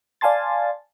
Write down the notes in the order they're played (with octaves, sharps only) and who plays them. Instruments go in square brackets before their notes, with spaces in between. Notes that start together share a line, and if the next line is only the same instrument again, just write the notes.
[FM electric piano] D5 F5 G#5 A5 C6 A6